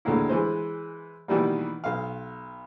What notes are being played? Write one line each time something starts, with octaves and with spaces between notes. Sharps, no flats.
D2 A2 G#3 A#3 E4
E3 G#3 B4 C5
B2 D#3 E3 G3 A#3
B1 F5